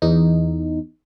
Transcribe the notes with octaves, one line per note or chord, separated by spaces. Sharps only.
E2 D#4